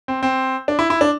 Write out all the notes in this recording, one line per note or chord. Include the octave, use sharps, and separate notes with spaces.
C4
C4
D4
E4
E4
D4